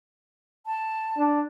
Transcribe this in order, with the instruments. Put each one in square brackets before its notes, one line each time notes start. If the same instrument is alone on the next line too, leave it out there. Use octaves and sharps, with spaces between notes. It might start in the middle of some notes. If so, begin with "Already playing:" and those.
[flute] A5
[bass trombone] D4